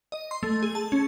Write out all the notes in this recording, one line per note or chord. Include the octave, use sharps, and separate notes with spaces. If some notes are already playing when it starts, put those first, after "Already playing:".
D#5
C6
A3
G#4
A5
C#4